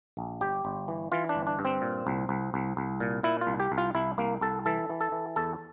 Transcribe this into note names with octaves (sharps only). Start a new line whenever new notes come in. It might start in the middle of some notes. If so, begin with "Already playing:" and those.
A#1
G1 G4
G1
E3
E3 F4
D4
G1
D4
G2
C4
A#2
C2
C2
C2
C2
A#2
A#2 E4
F4
C2
G4
C2
F4
C2 E4
C2 A#3
C2 A4
E3 A4
E3
A4
E3
E2 A4